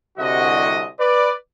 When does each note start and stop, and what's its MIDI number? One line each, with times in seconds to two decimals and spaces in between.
0.18 0.87 36
0.18 0.87 50
0.18 0.87 66
0.18 0.87 75
1.00 1.31 71
1.00 1.31 74